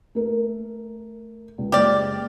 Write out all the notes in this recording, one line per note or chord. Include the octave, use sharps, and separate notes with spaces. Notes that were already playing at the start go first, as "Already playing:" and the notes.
A3 A#4
C#2
F#1 G#3 G4 D5 F6